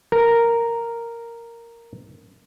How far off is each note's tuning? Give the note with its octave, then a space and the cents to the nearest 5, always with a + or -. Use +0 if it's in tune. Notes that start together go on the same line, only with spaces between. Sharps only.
A#4 -5